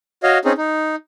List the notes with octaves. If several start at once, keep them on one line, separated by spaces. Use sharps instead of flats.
F#4 C#5 D#5 F5
C4 C#4 D#4 G#4
D#4